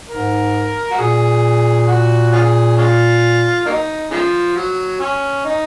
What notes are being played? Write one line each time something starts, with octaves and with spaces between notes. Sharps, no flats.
G#2 A#4
F#4
A#2 G#4
F#4
C#4 F4 G#4
G#3 C#4 F4
F#3 A#3 D#4
C#3 F3
F#3
C#4
D#4